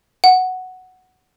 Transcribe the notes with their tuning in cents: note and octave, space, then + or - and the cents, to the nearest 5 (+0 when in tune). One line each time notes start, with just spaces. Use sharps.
F#5 +0